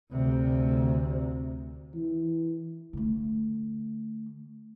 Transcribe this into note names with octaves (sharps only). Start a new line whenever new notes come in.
D2 C3
E3
D3 A3